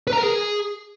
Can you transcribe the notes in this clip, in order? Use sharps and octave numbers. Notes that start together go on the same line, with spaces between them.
B4
A#5
A#4
G#4